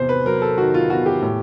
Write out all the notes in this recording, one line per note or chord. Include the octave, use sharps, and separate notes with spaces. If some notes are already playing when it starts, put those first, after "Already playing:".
Already playing: E2 C3 C5
B4
F#3 A#4
A4
D#3 F#4
F4
E2 F#4
G4
A2